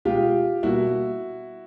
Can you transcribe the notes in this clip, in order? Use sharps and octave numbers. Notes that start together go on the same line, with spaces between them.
B2 G#3 F4 G4
B2 G3 A#3 E4 F#4